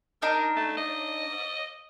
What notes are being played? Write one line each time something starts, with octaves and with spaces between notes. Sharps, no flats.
D4 D#4 A#4 A#5
A3
D#5